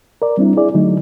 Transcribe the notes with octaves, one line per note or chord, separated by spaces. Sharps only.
A#4 D5
G3 C4 D4 E4
E4 G#4 D5
D3 F#3 A3 D#4